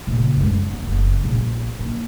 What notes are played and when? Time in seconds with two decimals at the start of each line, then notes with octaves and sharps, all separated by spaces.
0.07 A#2 C#3
0.37 F#2 G#3
0.70 B3 D#4
0.88 F#1
1.24 A#1
1.79 A#3